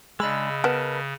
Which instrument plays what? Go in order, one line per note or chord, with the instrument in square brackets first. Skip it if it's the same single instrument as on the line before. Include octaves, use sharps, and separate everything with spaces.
[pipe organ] C#3 [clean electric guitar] G#3 D4 [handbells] D#5 B5 E6
[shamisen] B3 [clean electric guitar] A#4 B4 A5